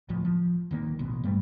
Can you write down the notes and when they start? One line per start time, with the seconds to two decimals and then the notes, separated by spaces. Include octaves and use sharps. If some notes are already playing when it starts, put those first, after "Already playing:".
0.09 C#2 A2 F3
0.25 F3
0.71 D1 D#3 A#3
0.99 A1 B2
1.24 G2 G3 A3